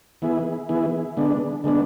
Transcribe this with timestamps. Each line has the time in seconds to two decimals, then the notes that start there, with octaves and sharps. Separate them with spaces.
0.22 E3 B3 E4 G#4
0.69 E3 B3 E4 G#4
1.17 D3 G#3 B3 D4
1.64 D3 G#3 B3 D4